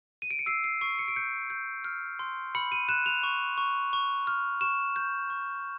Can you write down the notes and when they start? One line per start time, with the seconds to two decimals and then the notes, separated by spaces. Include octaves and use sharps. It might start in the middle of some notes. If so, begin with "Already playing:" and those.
0.22 D#7
0.31 D7
0.39 C#7
0.46 E6 C7
0.64 C7
0.81 C#6 C7
0.99 C#7
1.08 D7
1.16 G6 C#7
1.50 G6
1.84 F6
2.19 C6
2.55 B5 C#7
2.72 D#7
2.89 F#6 E7
3.06 F7
3.23 C#6
3.58 C#6
3.93 C#6
4.27 F6
4.61 C#6 E7
4.96 G6
5.30 C#6